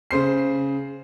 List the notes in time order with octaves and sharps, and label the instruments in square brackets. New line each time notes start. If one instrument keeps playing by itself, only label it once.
[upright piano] C#3 C5 C7